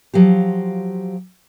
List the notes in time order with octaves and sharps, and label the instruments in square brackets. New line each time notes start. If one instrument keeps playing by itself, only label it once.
[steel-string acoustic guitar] F3 F#3 F4 G4